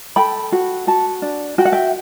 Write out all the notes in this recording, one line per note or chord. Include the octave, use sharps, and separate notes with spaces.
A4 G5 B5
F#4
F#4 F#5 A5
D4
F#4 G5
F#5
E5 G5